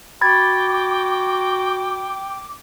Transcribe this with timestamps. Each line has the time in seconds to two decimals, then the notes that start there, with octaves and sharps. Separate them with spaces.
0.21 F#4 G5 B5 D6 G#6 A6